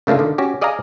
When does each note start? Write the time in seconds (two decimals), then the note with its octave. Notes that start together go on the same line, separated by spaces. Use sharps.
0.07 C#3 A3 A#3 D4 F4
0.19 D3 D#3
0.38 C#4 F#4 G4
0.61 G#4 D5 D#5 F5 G#5 A#5